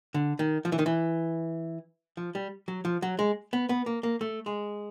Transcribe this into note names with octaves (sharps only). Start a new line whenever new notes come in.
D3
D#3
F3
E3
D#3
E3
F3
G3
F#3
F3
F#3
G#3
B3
B3
A#3
A#3
A3
G#3